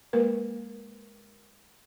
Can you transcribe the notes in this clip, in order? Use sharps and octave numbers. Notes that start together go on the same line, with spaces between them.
G#3 A#3 A#4 B4